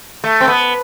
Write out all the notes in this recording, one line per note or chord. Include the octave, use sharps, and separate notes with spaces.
A3
C4
B3